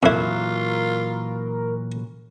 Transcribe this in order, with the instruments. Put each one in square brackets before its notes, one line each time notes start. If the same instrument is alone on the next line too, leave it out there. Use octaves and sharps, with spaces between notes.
[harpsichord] F2 E4 [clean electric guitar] A#2 E3 F#3 [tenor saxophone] F4 [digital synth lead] A#4